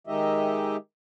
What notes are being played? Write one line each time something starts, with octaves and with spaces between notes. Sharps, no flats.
D#3 G#3 D#4 G4 D#5 E5